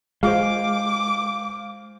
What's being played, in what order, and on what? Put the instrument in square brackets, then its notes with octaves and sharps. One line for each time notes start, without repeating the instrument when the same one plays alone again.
[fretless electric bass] G#3 [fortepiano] F4 C5 [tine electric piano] F5 [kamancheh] D6